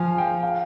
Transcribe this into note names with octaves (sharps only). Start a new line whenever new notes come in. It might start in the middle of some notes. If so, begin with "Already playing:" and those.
Already playing: F3 F5 G#5
G5
F5